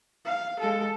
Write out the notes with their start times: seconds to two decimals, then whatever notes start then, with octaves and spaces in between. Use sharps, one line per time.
0.25 F5
0.60 G#3 A4